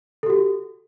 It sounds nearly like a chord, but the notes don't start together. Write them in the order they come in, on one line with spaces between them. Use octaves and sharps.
A4 G4 F#4